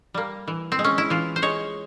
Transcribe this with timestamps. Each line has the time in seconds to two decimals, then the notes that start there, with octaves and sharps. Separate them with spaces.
0.14 G3 A#3
0.48 E3
0.72 C4
0.79 G#3
0.84 C#4
0.98 E4
1.10 E3 F4
1.36 C5
1.42 G#3 C#5